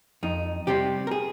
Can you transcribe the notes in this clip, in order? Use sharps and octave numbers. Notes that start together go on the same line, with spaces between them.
F2 D#4
C3 G3 C4 G4
A#4
G#4